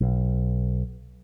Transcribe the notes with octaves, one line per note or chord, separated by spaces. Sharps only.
B1